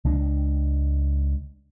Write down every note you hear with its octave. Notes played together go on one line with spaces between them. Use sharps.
C#2 G#3 D4